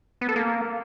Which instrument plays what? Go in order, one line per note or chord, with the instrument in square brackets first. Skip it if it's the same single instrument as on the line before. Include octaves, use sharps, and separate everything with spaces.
[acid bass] B3
A4
A#3